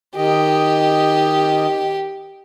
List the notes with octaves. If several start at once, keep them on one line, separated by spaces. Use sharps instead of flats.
D#3 G4 D#5